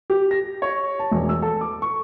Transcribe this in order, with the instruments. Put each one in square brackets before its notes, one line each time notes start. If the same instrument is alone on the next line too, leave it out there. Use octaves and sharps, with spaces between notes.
[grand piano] G4
A#6
C#5
A5
E1
E6
A4
D6
C#6